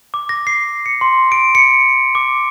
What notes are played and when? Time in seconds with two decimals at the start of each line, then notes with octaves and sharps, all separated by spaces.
0.14 D6
0.29 A#6
0.47 C7
0.86 C#7
1.01 C6
1.32 D7
1.55 C#7
2.15 D6